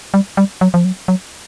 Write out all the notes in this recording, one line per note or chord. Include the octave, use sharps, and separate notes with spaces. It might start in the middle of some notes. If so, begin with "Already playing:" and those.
G3
G3
F#3
F3
F#3
F#3